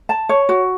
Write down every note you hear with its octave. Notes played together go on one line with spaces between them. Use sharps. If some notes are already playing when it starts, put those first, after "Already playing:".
A5
C#5
F#4